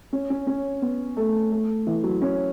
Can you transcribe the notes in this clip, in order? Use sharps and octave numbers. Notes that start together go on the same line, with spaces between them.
C#4
C#4
C#4
B3
A3
A3
E3
F#3
C#4